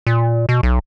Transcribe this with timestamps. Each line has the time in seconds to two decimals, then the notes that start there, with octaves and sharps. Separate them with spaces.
0.07 A#2
0.49 B2
0.63 B1